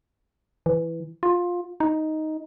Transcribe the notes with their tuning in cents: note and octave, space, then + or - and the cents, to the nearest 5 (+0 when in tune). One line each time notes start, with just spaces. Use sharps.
E3 +5
F4 +15
D#4 +5